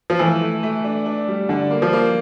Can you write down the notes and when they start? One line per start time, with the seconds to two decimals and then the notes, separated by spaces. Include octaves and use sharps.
0.10 F3
0.19 E3 A3
0.40 A3
0.63 A3
0.84 D4
1.06 D4
1.28 G3
1.49 D3 D4
1.70 A#3
1.82 F3
1.93 A#3